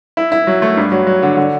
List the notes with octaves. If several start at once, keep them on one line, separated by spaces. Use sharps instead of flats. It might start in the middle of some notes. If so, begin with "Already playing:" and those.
E4
E4
F#3
A3
G2
F#3
F#3
D3
D3